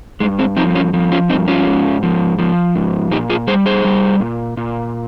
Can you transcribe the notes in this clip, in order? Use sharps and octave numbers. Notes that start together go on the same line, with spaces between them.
G2 G#3
G#3 C4
F3 C4 D#4
C#4 F4
F3
C#4 F4
G2 C4 D#4
C#4 F4
G#2
F3
F3
G#2
A#2 D#4 G4
F4 G#4
G3 G#4 C5
G#4 C5
G3
A#2
A#2